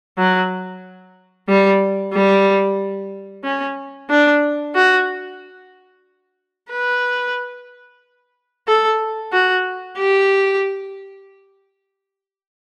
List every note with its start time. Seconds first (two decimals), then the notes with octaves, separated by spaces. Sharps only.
0.18 F#3
1.49 G3
2.14 G3
3.44 C#4
4.10 D4
4.75 F#4
6.71 B4
8.67 A4
9.33 F#4
9.98 G4